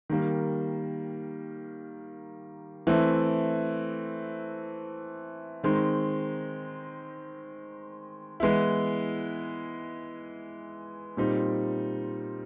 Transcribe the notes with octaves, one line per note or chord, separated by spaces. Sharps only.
D#3 G3 A#3
E3 A3 C4
D#3 G#3 C4 D#4
E3 G#3 B3 E4
A#2 G3 C4 D#4